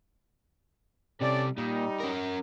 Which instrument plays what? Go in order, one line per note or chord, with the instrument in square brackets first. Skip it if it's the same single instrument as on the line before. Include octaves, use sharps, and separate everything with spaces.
[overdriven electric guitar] C3 G3 [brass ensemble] C#4 A4 D5
[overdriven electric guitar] A#2 [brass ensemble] G3 D#4
[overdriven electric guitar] C#4 A#4